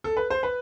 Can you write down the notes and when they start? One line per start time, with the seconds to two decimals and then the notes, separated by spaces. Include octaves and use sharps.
0.04 A4
0.17 B4
0.30 C5
0.43 B4